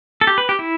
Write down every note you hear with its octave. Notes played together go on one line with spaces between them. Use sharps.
A4
G4
B4
G4
E4